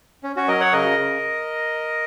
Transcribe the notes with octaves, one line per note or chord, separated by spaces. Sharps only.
C#4
C#4 F#4
F#3 A#4 D#5
C#5 F#5
C#3 A#4 D#5
C#3